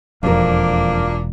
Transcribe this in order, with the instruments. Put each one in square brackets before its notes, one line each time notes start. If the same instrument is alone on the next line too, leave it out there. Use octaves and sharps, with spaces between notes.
[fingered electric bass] E1 [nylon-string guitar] F2 A#4 [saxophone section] A#2 A#3 D4